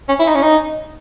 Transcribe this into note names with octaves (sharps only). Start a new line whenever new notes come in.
C#4
E4
D#4
C#4
D#4